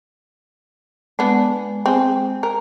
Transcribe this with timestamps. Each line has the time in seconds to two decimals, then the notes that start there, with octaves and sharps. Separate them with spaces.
1.19 G#3 B3 D4
1.86 C4 G#4
2.43 A#4